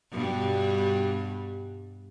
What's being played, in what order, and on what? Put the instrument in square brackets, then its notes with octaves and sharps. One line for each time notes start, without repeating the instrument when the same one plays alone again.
[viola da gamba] G2 B2 G3